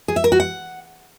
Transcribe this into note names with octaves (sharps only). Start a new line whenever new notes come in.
G#4
E5
A#4
F#4
F#5